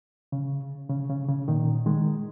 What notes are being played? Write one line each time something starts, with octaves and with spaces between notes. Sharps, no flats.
C#3
C#3
C#3
C#3
A#2 D#3
D#3 G#3